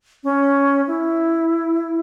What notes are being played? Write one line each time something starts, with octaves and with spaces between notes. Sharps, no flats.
C#4
E4